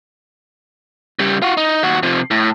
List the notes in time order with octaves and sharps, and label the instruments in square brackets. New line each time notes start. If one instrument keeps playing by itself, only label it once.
[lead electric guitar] C#3 G3
F4 F#4
D#4
D#2 F#4
C3 F3
A2